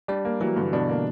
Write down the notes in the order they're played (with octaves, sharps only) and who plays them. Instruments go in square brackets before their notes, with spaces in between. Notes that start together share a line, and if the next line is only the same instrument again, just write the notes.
[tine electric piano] G3 [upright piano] D4
[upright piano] A#3
[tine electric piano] E3 [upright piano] F#3
[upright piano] G2 [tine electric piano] D3
[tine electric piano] B2 [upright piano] D4
[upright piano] A#3